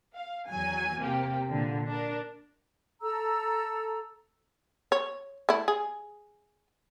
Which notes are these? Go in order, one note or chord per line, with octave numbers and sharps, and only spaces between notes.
F5
E2 D#3 F#3 G#5
C3 A#3 G4
A#2 D3
D4 A#4
A4 A#5 E6
C#5
A3 E4
G#4